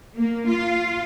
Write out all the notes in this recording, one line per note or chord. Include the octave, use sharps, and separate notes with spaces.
A#3
F4